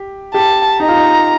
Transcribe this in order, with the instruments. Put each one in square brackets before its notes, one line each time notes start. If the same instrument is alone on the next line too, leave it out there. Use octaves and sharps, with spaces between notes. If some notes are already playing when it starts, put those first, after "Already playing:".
Already playing: [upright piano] G4
[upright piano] G4 [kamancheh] A5
[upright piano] D#4 [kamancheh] A#5
[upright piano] F4
D#4